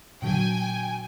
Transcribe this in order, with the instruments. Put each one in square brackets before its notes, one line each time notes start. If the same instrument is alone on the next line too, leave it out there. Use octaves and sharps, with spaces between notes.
[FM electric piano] A#2 D3 F#3 [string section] G5 G#5